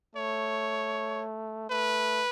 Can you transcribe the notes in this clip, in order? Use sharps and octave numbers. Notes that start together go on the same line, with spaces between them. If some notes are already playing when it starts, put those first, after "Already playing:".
A3 C#5
A3 B4